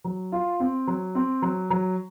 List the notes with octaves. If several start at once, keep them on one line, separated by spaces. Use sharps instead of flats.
F#3
F4
C4
F#3
C4
F#3
F#3